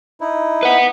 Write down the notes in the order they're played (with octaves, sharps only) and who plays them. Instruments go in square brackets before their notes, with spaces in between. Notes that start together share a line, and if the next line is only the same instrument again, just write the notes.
[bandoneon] D#4 E4
[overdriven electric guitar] B4 F#5